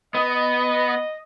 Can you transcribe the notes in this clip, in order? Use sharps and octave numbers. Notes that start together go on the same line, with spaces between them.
B3 D#5